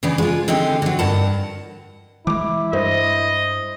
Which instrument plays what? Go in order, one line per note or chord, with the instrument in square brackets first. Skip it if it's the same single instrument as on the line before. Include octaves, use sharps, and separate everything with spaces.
[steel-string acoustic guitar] C#3 E3 B3 D4
G#3 F4
D3 C4 D#4 G4
D3 F#3
G2 A#4 F#5 A5
[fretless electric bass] E3 G#3 [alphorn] E4 [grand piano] D6
[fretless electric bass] G2 [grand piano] C5 [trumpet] D#5